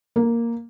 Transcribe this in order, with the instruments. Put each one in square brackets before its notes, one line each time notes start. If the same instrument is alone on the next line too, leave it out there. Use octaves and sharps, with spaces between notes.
[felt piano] A#3